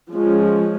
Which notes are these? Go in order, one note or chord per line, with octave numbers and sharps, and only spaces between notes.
F3 G#3 C#4